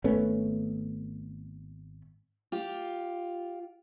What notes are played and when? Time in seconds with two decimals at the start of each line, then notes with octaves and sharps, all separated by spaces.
0.04 G#1 A3 B3 C#4
2.52 F4 G4